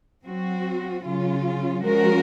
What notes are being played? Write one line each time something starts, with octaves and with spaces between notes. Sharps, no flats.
F#3 C4 F#4
C#3 F#3 C#4 F4
F3 G#3 C#4 F#4 A#4